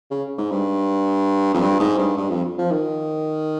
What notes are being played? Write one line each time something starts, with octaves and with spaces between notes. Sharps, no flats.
C#3
G#2
G2
F2
G2
G#2
G2
G2
F2
F3
D#3